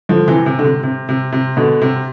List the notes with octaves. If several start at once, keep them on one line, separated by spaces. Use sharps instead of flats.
D3 F3
C3 E3
C3
D3
C3
C3
C3
C3
B2 D3
C3